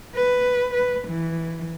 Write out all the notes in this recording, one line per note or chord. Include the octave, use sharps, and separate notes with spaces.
B4
B4
E3